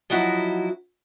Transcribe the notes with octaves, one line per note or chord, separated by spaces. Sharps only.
F3 F#3 D#4 E4 F#4